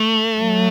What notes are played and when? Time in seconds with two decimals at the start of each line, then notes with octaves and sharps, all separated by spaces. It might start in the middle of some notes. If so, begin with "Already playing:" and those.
Already playing: A3
0.40 F#3